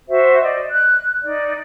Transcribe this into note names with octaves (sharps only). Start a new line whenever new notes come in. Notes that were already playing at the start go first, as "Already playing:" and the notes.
F#4 C5 E5
D5 D#5
F#6
D#4 D5